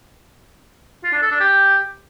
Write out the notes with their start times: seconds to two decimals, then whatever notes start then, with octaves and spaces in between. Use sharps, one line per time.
1.04 F4
1.13 D4
1.22 A4
1.31 D4
1.40 G4